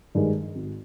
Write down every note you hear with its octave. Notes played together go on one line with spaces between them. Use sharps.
G2 D#3 G#3
G#1